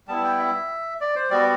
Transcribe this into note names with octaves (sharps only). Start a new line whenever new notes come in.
G3 B3 E4 A5
G5
E5
D5
C5
G3 B3 F#4 D5